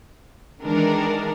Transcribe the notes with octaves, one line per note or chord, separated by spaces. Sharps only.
D#3 E3 G#3 D4 A#4